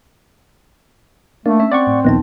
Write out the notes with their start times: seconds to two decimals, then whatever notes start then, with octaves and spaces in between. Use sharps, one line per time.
1.46 A3 A#3 D4
1.60 C#4 E5
1.72 C4 D5 F#5 C#6
1.87 A2
2.04 A#1 D#2 B3 D#4 A5